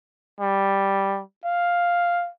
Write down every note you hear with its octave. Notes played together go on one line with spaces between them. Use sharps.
G3
F5